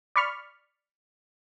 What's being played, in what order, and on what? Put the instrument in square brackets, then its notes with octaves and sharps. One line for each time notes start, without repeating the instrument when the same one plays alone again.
[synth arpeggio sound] D5 B5 C#6 F6